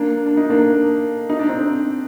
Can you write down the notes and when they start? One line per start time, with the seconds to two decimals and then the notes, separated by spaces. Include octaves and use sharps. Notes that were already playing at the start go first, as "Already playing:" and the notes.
Already playing: A#3 D4
0.26 D4
0.37 D#4
0.50 A#3 D4
1.29 D#4
1.39 D4
1.49 C4 D#4